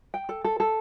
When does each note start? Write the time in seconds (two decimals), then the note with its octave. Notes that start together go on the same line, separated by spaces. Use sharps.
0.14 G5
0.29 A4
0.44 A4
0.60 A4